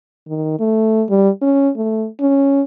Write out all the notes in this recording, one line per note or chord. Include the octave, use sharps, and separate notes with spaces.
D#3
A3
G3
C#4
A3
C#4